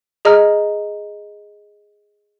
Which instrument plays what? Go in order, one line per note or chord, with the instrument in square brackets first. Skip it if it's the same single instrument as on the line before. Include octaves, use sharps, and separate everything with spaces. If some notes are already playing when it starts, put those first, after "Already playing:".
[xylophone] G#4 D#5 A#5 F6